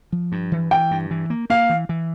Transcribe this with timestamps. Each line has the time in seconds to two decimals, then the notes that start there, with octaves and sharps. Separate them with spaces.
0.12 F3
0.32 G2
0.52 E3
0.71 E3 G5
0.91 G2
1.11 E3
1.30 A#3
1.50 A#3 F5
1.70 E3
1.89 E3